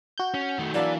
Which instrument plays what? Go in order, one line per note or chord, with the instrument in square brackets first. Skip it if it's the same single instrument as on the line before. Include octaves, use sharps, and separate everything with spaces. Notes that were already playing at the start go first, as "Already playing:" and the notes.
[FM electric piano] F#4 G6
[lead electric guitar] C#4
D#3 A3
[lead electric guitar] E3 [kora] F#3 A#3 D4 [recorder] D5